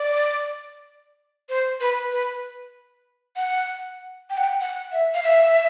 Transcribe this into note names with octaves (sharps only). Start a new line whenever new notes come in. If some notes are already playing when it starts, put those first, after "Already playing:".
Already playing: D5
C5
B4
B4
F#5
G5
F#5
G5
F#5
E5
F5
E5